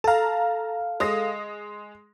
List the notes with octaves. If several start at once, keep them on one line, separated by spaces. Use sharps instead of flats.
A4 F5 A5 A#5
G#3 D#6 A#6